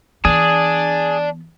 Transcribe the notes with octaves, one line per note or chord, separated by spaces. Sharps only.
E3 B3 D4 G#4